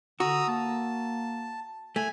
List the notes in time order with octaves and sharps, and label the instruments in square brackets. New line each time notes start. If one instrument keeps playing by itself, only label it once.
[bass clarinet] D3 [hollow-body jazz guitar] F#4 [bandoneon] A#5 D#6 E6
[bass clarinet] A#3 [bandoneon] A5
[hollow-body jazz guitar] A3 [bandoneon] G#5